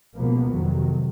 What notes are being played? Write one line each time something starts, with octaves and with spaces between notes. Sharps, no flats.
C#2 B2 F3 A#3 B3
F2 C3 D#3 F#3